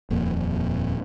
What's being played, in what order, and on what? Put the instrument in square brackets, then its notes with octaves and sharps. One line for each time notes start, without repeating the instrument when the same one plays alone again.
[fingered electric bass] D#1 F2 A#2